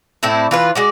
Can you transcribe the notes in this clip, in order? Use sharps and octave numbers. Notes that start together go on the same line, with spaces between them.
A2 C4 E4 D5
E3 F4 B4
G#3 F#4 D5